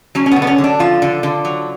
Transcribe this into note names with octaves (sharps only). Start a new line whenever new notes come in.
F#3 C#4
C#4
B3
D3
B3
C#4
D3
D4
F3 F4
D3
D3
F#3